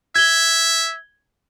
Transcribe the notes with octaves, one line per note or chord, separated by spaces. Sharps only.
E5 G#6 G7